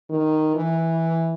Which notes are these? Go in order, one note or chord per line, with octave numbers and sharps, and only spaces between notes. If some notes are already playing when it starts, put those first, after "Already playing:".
D#3
E3